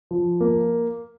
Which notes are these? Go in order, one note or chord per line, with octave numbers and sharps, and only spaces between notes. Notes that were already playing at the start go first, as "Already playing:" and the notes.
F3
A#3